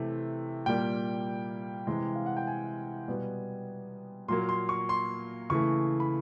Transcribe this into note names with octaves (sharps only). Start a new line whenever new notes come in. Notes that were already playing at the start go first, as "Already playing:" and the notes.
Already playing: C3 E3 A3
A#2 G3 A#3 G5
C3 E3 G#3
F5
F#5
G5
G#5
B2 G3 B3
A#2 F#3 A#3 C6
C6
C#6
C6
C#3 E3 A3 C#6
B5